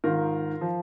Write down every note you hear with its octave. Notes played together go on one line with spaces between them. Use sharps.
G#2 D#3 F4 A#4
F3